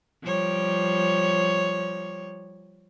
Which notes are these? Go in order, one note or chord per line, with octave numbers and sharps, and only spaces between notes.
F3 G3 C#5